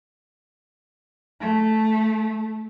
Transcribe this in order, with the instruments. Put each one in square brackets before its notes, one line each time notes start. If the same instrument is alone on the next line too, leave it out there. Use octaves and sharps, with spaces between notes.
[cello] A3